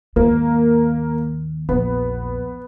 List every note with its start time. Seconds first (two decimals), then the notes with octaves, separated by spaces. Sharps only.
0.16 D#2 G#2 A#3
1.69 A#1 E2 B3